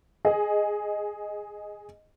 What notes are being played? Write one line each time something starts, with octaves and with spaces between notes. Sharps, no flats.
G#4 D#5